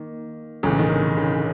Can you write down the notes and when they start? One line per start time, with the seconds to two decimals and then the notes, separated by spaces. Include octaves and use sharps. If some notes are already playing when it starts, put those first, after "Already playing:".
Already playing: D#3 A#3
0.63 B1 A2 C#3 E3
0.79 D#3
0.91 D3
1.17 C#3